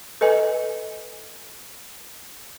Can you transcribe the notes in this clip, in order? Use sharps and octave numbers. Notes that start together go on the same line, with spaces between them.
A4 B4 D#5 G#5